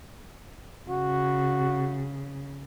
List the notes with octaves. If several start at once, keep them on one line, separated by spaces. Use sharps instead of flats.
C#3 F#4